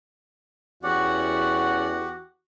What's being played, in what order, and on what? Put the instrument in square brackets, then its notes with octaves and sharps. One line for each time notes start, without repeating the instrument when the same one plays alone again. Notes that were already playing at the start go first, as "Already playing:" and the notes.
[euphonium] E2 [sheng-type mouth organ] C#4 D5 F#5 [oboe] F#4 [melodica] G4